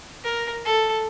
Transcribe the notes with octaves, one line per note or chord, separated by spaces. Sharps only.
A#4
A4